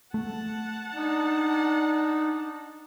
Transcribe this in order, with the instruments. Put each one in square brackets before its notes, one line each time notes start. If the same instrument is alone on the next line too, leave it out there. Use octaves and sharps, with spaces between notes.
[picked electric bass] A3 [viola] F#5 A5
[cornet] D4 [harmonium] D#4